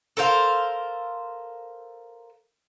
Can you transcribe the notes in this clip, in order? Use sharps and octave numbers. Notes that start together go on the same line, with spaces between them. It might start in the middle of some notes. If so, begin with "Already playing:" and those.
A4 A#4 C5 F5